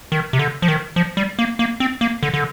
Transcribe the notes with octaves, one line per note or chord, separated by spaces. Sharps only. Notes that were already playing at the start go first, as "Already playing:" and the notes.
D#3
C3
D3
F3
D#3
F3
G3
A#3
A#3
C4
A#3
D3
D3